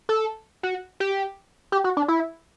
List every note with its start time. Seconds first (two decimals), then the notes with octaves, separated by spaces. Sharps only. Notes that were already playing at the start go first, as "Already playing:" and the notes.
0.09 A4
0.63 F#4
1.00 G4
1.72 G4
1.84 F#4
1.97 D4
2.08 E4